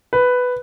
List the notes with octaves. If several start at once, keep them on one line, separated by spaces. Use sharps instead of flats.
B4